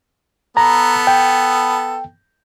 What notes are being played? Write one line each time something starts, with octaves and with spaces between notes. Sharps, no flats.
B3 A4 A#5
G5